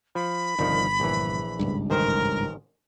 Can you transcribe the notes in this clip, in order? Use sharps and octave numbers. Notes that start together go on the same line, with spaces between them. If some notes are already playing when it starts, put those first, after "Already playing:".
F3 B5
G1 C2 D#3 F3
A#1 E3
G#1 C#2 G2
A1 D#3 A#4 C5